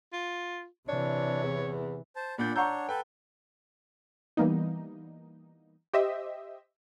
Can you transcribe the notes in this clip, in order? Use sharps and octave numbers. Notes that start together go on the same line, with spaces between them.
F4
C3 E3 D4 C#5
E2
C5 A5
A#2 D4 D5 F#5 B5 G6
D4 C#5 F#5 A#5 C#6 E6 G6
A4 B4 G5
E3 G3 A#3 B3 D#4
G4 C5 D#5 E5